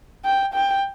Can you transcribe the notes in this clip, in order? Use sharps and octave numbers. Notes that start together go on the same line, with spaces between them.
G5
G5